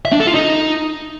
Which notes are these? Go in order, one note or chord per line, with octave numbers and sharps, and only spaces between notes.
E5
D4
A4
F4
D#4